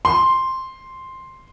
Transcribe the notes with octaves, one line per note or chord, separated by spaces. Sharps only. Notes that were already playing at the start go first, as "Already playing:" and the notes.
C6